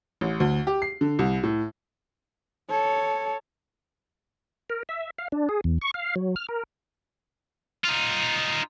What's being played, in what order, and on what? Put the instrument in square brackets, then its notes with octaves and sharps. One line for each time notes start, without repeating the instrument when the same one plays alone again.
[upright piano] A1
D2
G4
C7
D3
C2
A2
[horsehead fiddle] A4 C#5
[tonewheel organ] A#4
E5
F5
D4
G#4
E2
C#6
F5
F#3
F6
A#4
[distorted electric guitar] D#4 F4